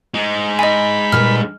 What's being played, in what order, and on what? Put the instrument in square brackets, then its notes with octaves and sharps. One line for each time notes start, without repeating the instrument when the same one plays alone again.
[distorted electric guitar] G#3 D#4
[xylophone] D#5 G#5 [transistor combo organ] B5
[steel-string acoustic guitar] A#2 G3 B4 [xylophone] F6